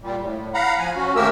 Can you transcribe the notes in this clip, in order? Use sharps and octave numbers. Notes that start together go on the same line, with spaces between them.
A#2 G3
A2
F5 F#5 A#5 B5
F3 G#5
C#4 F#4
D#2 A3 A#3 G4 A#4 E6